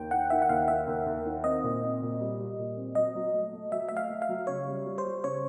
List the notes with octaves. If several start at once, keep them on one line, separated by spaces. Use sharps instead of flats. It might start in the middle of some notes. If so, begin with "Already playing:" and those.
Already playing: D#2 G5
D#3 F#5
D#3 E5
F#5
D#2 F5
D#3 E5
D#2
D#2
D#3
C4 D#5
A#2
C4
A#2
G3
G3
A#2
C4
F#3 D#5
F#3
A3
A3
F#3 E5
A3 E5
F5
A3
F5
F#3
C#3 C#5
G3
G3
C5
G3
C#3 C#5